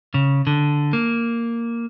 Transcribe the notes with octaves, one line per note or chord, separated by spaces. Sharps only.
C#3
D3
A#3